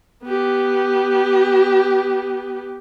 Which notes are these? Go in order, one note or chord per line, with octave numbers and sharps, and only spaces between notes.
B3 G4